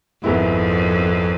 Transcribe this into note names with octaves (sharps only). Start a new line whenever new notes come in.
G#1 F2 G#2 G#3 B3 E4